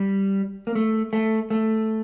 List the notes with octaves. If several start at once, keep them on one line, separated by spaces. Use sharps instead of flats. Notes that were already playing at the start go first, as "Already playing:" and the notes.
Already playing: G3
A#3
A3
A3
A3